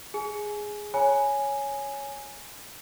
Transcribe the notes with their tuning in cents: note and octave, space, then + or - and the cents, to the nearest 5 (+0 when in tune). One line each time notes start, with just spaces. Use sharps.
G#4 +0 G#5 +20
C#5 +0 G#5 +0 B5 -35